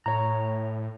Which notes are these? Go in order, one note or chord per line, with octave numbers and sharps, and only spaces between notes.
A2 C#5 A#5